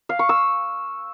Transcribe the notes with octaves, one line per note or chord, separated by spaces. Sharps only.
F5
C#6
E6